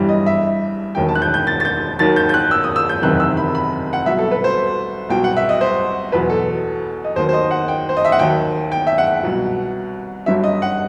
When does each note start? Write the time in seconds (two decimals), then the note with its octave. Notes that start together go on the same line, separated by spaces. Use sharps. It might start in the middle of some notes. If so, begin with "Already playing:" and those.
Already playing: G1 G2 E3 G3
0.09 D#5
0.26 E5
0.95 E1 D#2 D#3 F#3 G5
1.09 A5
1.15 F#6
1.22 G6
1.34 G6
1.47 A6
1.60 A6
1.65 G6
1.99 D#2 D#3 F#3 A6
2.16 G6
2.29 G6
2.34 F#6
2.51 E6
2.64 D#6
2.76 E6
2.89 G6
3.02 F#1 E2 C3 D#3 F#6
3.20 E6
3.37 B5
3.55 B5
3.93 F#5
4.05 C2 B2 F#3 E5
4.19 A4
4.31 B4
4.44 C5
5.09 C2 B2 F#3 G5
5.24 F#5
5.37 E5
5.49 D#5
5.61 C5
6.12 E2 B2 F#3 B4
6.30 A4
7.05 D#5
7.16 D#2 D#3 F#3 C5
7.29 C5
7.33 D#5
7.51 F#5
7.68 G5
7.89 C5
7.97 D#5
8.05 E5
8.12 F#5
8.19 D#2 D#3 F#3 G5
8.72 G5
8.87 E5
8.98 F#5
9.23 C2 B2 F#3
10.26 G1 G2 F#3 E5
10.44 D#5
10.62 F#5